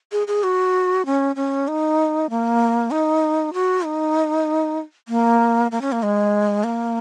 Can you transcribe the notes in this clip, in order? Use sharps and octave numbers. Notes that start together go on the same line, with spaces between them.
G#4
G#4
F#4
C#4
C#4
D#4
A#3
D#4
F#4
D#4
A#3
A#3
C#4
A#3
G#3
A#3